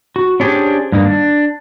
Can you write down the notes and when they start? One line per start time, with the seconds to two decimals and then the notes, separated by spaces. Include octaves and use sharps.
0.16 F#4
0.40 C#4 D4 G4 G#4 C5
0.92 G2 D#3 A#3
1.05 D4